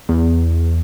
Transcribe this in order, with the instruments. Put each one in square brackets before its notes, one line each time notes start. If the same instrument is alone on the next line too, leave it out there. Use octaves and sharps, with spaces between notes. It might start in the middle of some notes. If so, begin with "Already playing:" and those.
[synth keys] E2